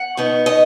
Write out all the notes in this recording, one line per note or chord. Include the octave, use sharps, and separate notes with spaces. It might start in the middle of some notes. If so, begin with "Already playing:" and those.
Already playing: F#5
B2 B3 D#4
D#5